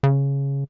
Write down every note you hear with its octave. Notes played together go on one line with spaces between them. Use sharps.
C#3